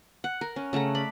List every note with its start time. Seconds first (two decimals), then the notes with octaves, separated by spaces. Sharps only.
0.24 F#5
0.41 A#4
0.56 C#4
0.73 C#3 A3 F#5 A#5
0.95 D5 B5